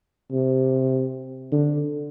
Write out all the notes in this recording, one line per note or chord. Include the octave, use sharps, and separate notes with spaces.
C3
D3